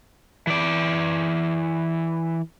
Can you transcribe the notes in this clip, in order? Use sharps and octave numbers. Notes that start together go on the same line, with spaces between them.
E3 D5